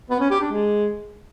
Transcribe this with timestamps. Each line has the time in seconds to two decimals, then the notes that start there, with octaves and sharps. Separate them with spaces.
0.10 B3
0.20 C#4
0.31 G4
0.41 D4
0.51 G#3